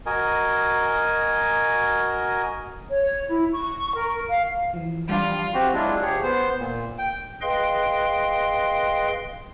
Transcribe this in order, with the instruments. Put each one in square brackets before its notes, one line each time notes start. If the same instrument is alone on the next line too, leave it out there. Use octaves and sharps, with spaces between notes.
[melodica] F#4 A#4 D#5 G#5
[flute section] C#5
E4
C#6
A#4
F5
[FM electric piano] E3 F3
[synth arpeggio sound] G3 D4 [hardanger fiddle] F4
[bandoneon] C4 F#4 G4
F#3 G#3 D4 E4 F4
D2 G4 G#4 C#5
B3 C5
A#2
G5
[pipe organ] G#4 B4 D#5 F5 G5 C6